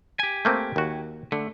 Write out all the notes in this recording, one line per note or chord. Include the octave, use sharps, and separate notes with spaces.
G4 G#5
A3 A#3 C4
D#2 F#4
D3 A3